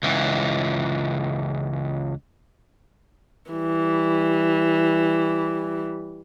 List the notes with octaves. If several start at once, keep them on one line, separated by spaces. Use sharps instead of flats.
C#2 E3
E3 G3